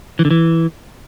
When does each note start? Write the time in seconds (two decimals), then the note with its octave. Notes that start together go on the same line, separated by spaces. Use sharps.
0.19 E3
0.25 D3
0.31 E3